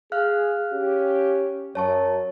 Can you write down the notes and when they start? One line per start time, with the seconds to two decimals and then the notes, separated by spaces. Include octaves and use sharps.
0.12 G#4 F5 F6 F#6
0.72 C#4 G4
1.75 F#2 C#5 A5 C#6